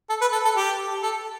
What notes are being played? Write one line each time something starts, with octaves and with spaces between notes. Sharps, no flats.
A4
B4
A4
A4
G4
A4